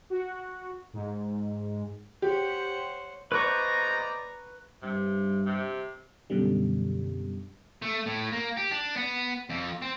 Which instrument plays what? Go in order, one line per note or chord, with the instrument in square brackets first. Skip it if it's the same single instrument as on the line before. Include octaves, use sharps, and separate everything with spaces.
[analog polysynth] F#4
G#2
[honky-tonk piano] G4 [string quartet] C5 C#5 F#5
[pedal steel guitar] B4 C#6 [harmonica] C5 D5 D#5 [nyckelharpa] A#5
[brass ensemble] G2 [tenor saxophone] C3
[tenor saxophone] C3
[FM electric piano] F#2 B2 D3 G3
[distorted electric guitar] A3
A2
A#3
G4
D4
B3
F2
C4